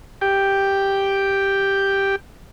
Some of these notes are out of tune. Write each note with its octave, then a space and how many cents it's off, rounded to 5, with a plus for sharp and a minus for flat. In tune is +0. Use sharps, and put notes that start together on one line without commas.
G4 +0 G5 +0